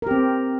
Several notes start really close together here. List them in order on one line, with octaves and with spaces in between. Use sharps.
A#4 G4 C4